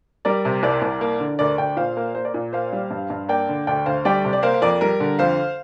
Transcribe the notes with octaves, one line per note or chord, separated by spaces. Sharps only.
G3 A#4 D5
C3
C2 A#4 D5
C2
A#3
D3
D2 A#4 D5
D2 D5 G5
A#2 C5 F5
A#3
A#3 C5
A#4 D5
A#2
A#3 C5 F5
G3
G2
G2
A#3 D5 G5
D3
D2 D5 G5
D2 C5 F5
G3 D5 G5
C3
D5
A#3 C5 F5
F5
F2 A#4 D5
G3 A#4
D3
F2 C5 F5